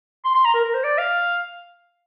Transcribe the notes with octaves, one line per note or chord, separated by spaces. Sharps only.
C6
C6
A#5
A#4
A#4
C5
D5
F5